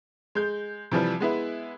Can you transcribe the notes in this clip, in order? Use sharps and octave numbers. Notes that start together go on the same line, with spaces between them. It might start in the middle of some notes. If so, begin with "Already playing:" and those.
G#3 G6
C3 E3 F3 G3
G#3 B3 E4